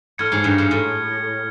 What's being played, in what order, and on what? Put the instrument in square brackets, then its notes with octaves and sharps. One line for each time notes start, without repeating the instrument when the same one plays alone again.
[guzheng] A2 [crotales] F6 G#6 C#7
[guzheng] G#2
G2
G#2
A2